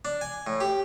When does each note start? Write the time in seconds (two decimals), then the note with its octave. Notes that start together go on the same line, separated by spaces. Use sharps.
0.05 D4
0.21 G#5
0.47 A2
0.60 G4